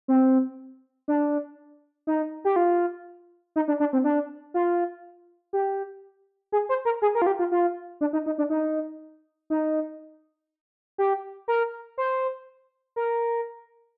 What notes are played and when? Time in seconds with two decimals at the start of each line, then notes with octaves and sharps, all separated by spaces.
0.08 C4
1.08 D4
2.07 D#4
2.45 G4
2.56 F4
3.56 D#4
3.68 D4
3.80 D4
3.93 C4
4.04 D4
4.54 F4
5.53 G4
6.52 G#4
6.69 C5
6.85 A#4
7.02 G#4
7.15 A#4
7.22 F4
7.27 G4
7.39 F4
7.52 F4
8.01 D4
8.13 D#4
8.26 D#4
8.38 D4
8.50 D#4
9.50 D#4
10.98 G4
11.48 A#4
11.98 C5
12.96 A#4